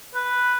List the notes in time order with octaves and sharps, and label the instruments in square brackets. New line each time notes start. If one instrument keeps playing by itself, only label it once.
[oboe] B4